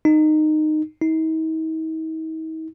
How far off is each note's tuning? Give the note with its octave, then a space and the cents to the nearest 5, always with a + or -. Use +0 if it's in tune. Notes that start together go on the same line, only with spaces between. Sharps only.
D#4 -15
D#4 +45